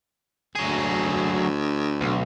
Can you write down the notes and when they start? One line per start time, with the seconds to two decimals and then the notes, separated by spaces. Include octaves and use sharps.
0.55 D2 F#3 G#4
2.01 B1